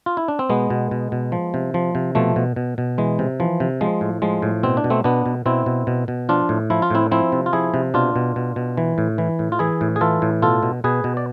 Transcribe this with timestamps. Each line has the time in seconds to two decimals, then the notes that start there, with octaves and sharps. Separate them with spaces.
0.06 F4
0.17 E4
0.28 D4
0.39 C4
0.49 B2 G#3 B3
0.70 B2
0.91 B2
1.12 B2
1.32 F3
1.54 C3
1.74 F3
1.95 C3
2.15 B2 F3 A3
2.36 B2
2.56 B2
2.78 B2
2.98 E3 G#3
3.19 C3
3.40 E3 F3
3.60 C3
3.81 F3 G#3
4.01 A2
4.22 F3 G#3
4.42 A2
4.63 B2 C4
4.77 D4
4.84 B2
4.90 A3 C4
5.04 B2 B3 D4
5.26 B2
5.46 B2 C4 E4
5.66 B2
5.87 B2
6.08 B2
6.29 F3 D4 F4
6.49 A2
6.70 F3 E4
6.82 F4
6.90 A2 C4 E4
7.11 F3 C4 E4
7.32 C3
7.46 F4
7.53 F3 E4 G#4
7.74 C3
7.94 B2 D4 F4
8.16 B2
8.36 B2
8.56 B2
8.77 E3
8.98 A2
9.18 E3
9.39 A2
9.52 F4
9.59 E3 E4 G#4
9.81 A2
9.96 G#4
10.01 E3 F4 A4
10.22 A2
10.42 B2 F4 A4
10.63 B2
10.84 B2 G#4 B4
11.04 B2
11.17 D5